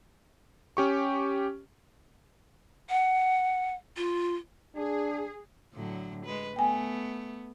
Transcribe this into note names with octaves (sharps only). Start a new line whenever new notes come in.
C#4 G4 C#6
F#5
F4
D4 G#4
A2 D3 F#3
G#3 B4
A3 B3 G5 G#5